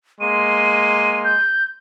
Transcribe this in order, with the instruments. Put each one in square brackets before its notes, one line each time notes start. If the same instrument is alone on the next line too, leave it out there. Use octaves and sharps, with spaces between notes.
[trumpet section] G#3 A#3 C6 [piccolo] D#7
[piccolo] G6